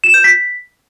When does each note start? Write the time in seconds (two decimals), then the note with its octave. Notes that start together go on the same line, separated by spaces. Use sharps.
0.04 E7
0.14 G6
0.24 B6